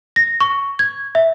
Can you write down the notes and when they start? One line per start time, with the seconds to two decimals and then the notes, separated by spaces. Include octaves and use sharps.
0.16 A#6
0.40 C#6
0.79 G#6
1.15 E5